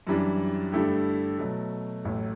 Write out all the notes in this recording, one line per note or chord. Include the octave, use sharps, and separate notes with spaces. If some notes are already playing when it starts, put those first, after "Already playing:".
F#2 E3 G3 D4
G2 D3 A3 E4 G4
B2 F#3 A3
A1 A2 F#3 A3